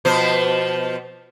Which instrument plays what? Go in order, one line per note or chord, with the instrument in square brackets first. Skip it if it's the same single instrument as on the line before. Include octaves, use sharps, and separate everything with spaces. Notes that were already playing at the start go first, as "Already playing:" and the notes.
[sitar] B2 F3 C5